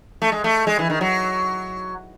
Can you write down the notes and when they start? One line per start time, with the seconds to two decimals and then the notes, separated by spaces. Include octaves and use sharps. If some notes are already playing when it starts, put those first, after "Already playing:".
0.22 A3
0.32 G#3
0.44 A3
0.67 G#3
0.79 E3
0.90 D#3
1.01 F#3